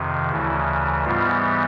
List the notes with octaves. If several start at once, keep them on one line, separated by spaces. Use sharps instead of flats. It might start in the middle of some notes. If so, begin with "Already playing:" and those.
Already playing: F2 C3 D#3
D2 C#3 E3 E4
G#2 E3 G3 B3 F4